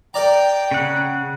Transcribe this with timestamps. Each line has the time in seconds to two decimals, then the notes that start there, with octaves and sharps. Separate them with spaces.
0.14 A#4 D5 G5 A#5
0.71 C#3 F#5